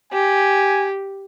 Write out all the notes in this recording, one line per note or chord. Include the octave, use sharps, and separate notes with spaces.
G4 G#5